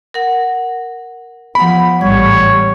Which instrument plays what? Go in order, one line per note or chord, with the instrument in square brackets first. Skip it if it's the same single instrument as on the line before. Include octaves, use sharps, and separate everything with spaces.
[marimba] A#4 F#5
[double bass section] F3 [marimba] B3 F#5 [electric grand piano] B5
[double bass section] A1 G#2 G3 [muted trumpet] C#5 [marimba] G#6